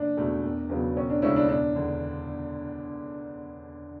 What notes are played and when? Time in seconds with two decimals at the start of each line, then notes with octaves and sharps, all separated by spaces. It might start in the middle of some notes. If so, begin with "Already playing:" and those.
Already playing: F#1 D4
0.17 E2 B2 A3
0.43 E1
0.69 E2 C#3 F#3 B3
0.96 E1 C#4
1.10 D4
1.22 D2 C#3 G#3 C#4 E4
1.36 D4
1.49 E1 D4
1.76 E2 D3